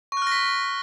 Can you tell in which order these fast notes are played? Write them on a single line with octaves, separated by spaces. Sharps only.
C#6 F#6 F6 A#6 B6